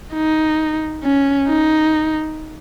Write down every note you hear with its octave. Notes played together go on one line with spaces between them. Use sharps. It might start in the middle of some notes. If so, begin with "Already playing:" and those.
D#4
C#4
D#4